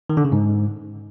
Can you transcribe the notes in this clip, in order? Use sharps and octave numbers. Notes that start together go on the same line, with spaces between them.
D#3
D3
C#3
G#2